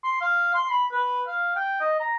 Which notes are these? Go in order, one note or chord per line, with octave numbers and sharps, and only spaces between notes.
C6
F5
C6
B5
B4
F5
G5
D#5
A#5